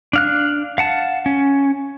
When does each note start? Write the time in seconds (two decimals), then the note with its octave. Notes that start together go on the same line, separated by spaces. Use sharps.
0.13 D4 F5 F#6
0.78 F5 F#5 A5
1.26 C#4